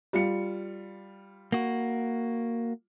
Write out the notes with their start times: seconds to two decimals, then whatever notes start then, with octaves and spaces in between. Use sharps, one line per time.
0.13 G3 F4 C#7
1.52 A#3 F#4